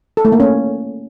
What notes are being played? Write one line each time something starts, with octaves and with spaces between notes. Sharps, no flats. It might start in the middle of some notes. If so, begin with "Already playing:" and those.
A4
A3
A#3
C#4